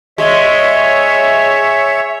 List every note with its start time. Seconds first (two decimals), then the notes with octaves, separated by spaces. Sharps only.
0.18 G#3 C#5 E5